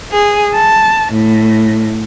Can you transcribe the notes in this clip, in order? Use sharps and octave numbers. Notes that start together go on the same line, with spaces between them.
G#4
A5
A2